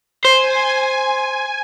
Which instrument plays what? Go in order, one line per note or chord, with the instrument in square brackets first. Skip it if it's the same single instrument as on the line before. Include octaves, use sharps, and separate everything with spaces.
[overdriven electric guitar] C5 [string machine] G#5